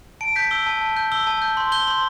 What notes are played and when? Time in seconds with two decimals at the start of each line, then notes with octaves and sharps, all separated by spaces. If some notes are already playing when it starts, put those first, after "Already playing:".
0.21 A5 D7
0.36 G6 B6
0.51 E6 G7
0.66 A5
0.81 A5
0.97 G6
1.12 E6 G7
1.27 A5
1.42 G6
1.57 C6
1.72 G6 G7
1.87 C6